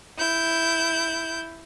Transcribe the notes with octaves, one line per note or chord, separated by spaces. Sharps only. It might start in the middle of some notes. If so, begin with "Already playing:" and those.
E4 G6